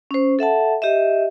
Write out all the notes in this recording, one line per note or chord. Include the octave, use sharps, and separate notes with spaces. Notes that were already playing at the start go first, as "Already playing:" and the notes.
C#4 C5
A4 E5 F#5 A5
G4 D#5 E5